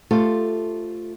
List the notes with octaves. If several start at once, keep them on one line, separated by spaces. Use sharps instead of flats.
A3 F4 G4 A4 C5 F5